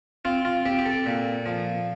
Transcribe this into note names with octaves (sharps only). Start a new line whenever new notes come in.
C4 F4
F4
C4 G4
G4
A4
A#2
F3